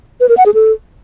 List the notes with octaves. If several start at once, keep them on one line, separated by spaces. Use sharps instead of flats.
B4
A#4
F#5
G#4
A4